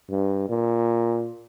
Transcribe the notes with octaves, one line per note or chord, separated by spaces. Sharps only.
G2
A#2